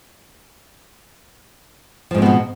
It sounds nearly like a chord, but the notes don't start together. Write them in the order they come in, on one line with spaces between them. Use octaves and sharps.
F3 G#2 C4 B3 B2